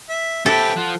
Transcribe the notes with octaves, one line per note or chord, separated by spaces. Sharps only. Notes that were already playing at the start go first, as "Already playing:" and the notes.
E5
C4 G4 A4 B4 E5 G5
F3 F4 F#5